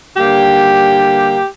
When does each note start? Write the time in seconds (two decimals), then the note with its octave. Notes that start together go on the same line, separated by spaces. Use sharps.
0.16 D3 G3 A#3 G4